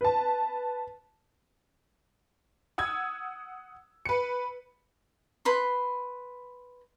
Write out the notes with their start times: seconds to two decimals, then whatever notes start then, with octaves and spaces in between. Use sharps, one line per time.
0.01 B4 A5
2.78 F#5 D#6 E6 G#6
4.05 B4 C#7
5.45 B4 B5 C6